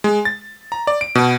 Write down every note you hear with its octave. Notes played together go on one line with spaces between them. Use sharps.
G#3
A6
A#5
D5
D7
B2